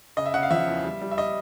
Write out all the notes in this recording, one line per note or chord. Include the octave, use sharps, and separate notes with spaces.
C#3 D#5
E5
C#3 F#5
F5
F3 E5
E2
G3
G3
E5
D#5